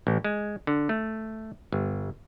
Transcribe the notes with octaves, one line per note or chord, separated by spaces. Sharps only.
A1
G#3
D3
A3
G1